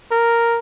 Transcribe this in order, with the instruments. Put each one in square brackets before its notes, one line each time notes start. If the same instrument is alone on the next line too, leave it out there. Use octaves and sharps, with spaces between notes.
[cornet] A#4